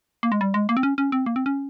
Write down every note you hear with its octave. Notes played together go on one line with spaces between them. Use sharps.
A#3
G#3
G3
G#3
A#3
C4
C#4
C#4
C4
A#3
C4
C#4